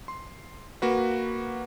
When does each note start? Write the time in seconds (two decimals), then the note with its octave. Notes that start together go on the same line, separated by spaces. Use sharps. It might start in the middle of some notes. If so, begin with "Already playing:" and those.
0.08 C6
0.82 A#3 F#4 B4